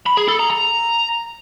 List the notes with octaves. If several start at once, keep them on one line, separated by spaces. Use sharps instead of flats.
B5
G#4
A4
A#5
A#5